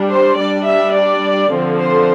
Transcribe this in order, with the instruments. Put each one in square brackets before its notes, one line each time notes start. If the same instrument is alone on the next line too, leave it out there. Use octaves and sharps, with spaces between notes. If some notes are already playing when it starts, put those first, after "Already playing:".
Already playing: [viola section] G3 D4
C5
G3 D4 D5
E5
D5
D3 F3 C4
C5